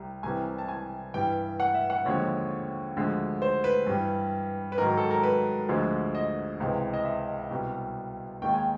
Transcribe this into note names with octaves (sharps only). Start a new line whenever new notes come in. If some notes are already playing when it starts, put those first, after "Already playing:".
Already playing: C2 G3
C2 C3 E3 G3 G#5
A5
G#5
G2 E3 G3 G5
F#5
E5
F#5
D#2 D3 F3 G#3 C#5
D2 D3 F3 G#3
C5
B4
G2 E3 G3
B4
G#2 D#3 F#3 A#4
A4
A#4
B4
D2 D3 F3 G#3
D#5
C#2 C3 E3 G#3
D#5
E5
C2 B2 G3
D#2 D#3 G#3 G5
G#5